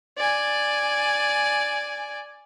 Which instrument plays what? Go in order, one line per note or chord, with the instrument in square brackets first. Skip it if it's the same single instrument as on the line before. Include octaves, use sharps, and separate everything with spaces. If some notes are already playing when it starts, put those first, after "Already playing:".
[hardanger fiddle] D5 G#5